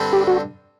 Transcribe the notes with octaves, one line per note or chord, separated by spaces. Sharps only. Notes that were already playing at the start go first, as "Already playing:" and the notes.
Already playing: G2 D3 G3 C4
G4
F#4